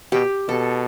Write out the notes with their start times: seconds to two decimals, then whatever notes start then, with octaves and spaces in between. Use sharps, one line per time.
0.12 B2 G4
0.48 B2 A4